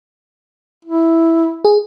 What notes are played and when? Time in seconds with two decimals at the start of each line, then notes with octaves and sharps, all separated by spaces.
0.85 E4
1.65 G#4